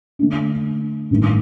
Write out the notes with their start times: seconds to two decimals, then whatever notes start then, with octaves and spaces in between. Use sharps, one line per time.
0.19 D3 A3 D4
1.10 A1 G2 D#3 A3